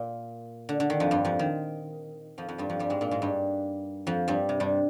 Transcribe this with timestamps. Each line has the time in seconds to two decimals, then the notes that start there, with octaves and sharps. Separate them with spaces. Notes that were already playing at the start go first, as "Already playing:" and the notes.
Already playing: A#2
0.69 D3
0.80 D3
0.90 D#3
1.00 F2 F3
1.11 G2 G3
1.25 F2 F3
1.39 D#3
2.38 F2 F3
2.48 F2 F3
2.58 G2 G3
2.70 F2 F3
2.79 G2 G3
2.90 G#2 G#3
3.01 A#2 A#3
3.11 G#2 G#3
3.22 G2 G3
4.07 F2 F3
4.28 G2 G3
4.49 C3
4.60 G2 G3